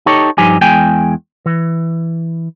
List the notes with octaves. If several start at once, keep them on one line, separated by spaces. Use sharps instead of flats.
D#4 G4 A4 C#5
G2 F3 D#4 G4 G#5
E2 G#3 G5 G#5
E3